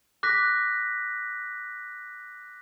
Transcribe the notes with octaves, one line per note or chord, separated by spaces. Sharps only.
D6 F#6 A#6 B6